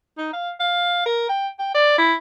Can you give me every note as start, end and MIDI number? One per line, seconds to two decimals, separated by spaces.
0.18 0.32 63
0.33 0.50 77
0.60 1.01 77
1.06 1.26 70
1.29 1.48 79
1.59 1.70 79
1.75 1.97 74
1.98 2.14 64